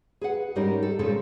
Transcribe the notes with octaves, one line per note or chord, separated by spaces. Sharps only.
G#4 B4 F#5
G#2 G3 C#4 D#4 A#4
A4
A#2 C#3 G#3 A3 C4 A4